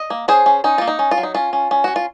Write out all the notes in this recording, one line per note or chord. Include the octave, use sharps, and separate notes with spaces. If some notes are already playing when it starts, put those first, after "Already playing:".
Already playing: D#5
A#3
C#4 G#4 C5
C#4
C#4 D#4
A#3 F4
D#4
C#4
F4
F#3
D#4
C#4 F4
C#4
C#4
C#4 F#4
F4